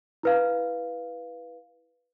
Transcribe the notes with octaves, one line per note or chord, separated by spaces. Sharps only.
E4 B4 F5